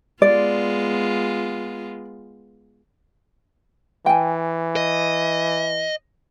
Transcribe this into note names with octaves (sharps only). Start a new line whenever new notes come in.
G#3 B3 F4 D5
E3 G5 G#5
D#5